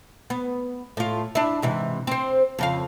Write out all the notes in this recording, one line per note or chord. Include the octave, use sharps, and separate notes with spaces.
B3
A2 F4
D4 E4
G#2 C3 E3
C4 C5
F2 C#3 F5